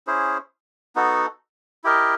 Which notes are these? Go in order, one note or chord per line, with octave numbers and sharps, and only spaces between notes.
C#4 E4 G#4 C5
B3 D#4 F#4 A4
E4 G4 A#4 D#5